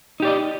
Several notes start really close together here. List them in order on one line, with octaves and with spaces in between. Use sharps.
D#4 G4 D5 D#5